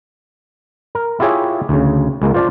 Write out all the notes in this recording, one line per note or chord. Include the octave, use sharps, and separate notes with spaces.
A#4
E4 F4 G4 G#4 C#5 E5
D2 C#3
C#2 G#3 A#3
F4 C5 D5 F5 A5